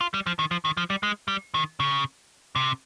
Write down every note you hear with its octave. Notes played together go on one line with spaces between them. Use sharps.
F4
G3
F3
D#3
F3
D#3
F3
G3
G#3
G3
D#3
C#3
C3